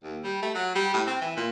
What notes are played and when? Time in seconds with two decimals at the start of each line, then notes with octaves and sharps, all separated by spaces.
0.03 D#2
0.24 G3
0.42 A3
0.54 F#3
0.76 G3
0.94 A2
1.07 C4
1.21 E3
1.37 A#2